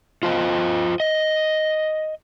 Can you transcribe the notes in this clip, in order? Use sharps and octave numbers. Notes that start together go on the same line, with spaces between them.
F4 C5 D#5
D#5